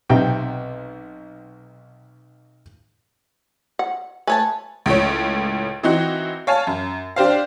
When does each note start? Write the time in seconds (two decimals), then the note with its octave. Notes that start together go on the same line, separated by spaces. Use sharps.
0.09 B1 C3 G5
3.79 F#5
4.27 A3 B4 C#5 G#5 A5
4.86 C#2 A2 C#5
5.83 E3 C4 D#4 F#4
6.47 C#5 F5 G#5 A5
6.67 F#2
7.16 D4 G4 C5 F5